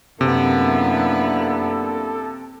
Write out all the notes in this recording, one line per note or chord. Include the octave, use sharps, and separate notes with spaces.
F#2 C3 A#3 B3 D4 E4 A4